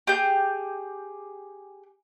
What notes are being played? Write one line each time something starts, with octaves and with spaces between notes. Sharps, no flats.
G4 G#4 G6